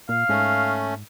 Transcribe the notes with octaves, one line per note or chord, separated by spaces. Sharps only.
A#2 F5
G#2 A3 C#4